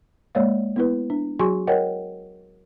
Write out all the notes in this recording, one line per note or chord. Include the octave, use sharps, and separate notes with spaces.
G#3 A#3 C#5 D5 F5
B3 E4 B4
D4
F#3 F#4 G#4 G#5 C6 C#6
A#4 C#5 D#5 F#5 G5